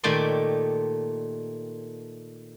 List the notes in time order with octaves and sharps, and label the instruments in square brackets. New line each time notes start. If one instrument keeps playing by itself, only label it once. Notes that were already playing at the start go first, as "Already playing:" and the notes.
[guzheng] A#2 D#3 A3 G4 D5 C6